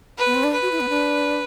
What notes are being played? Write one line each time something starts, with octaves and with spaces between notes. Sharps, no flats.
B4
B3
C4
D4
B4
F#4
E4
B3
D4